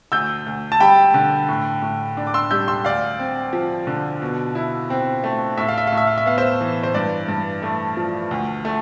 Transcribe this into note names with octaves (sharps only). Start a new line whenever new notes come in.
D2 E6 G6
D2
A5
G3 G5 B5
D3
A2
A2
D4
D6
C6 E6
G3 E6 G6
C6 E6
D2 D5 F5
C4
F3
D3
B2
E4
C4
A3
A2 E5
F5
E5
A2 F5
E5
F5
E5
B3 F5
C5 E5
E3
C5
G2 D5
G2
A3
F3
D2
A3